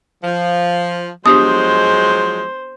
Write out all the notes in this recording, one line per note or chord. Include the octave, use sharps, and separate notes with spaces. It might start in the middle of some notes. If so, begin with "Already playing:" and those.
F3
F3 F#3 G#3 B3 D4 G4 C5 D#6